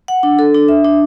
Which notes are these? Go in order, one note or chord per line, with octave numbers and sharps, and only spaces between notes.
F#5
D4
A4
D4
E5
D4